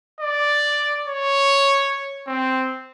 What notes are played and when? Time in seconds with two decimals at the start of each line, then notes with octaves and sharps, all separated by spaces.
0.20 D5
1.07 C#5
2.28 C4